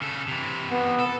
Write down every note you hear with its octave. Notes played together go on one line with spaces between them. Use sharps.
C#3 A4
C3 E3
B3
A4